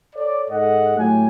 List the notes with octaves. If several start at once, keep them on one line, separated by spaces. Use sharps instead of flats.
A4 C#5 D5
G#2 G#3 A4 D#5 F#5
A2 F#3 A3 G4 G#5